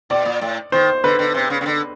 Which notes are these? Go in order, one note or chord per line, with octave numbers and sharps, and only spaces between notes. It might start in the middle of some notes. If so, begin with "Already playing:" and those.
B2 D5
A#2
A2
D#3 C5
D3 B4
D3
C3
C#3
C#3
D3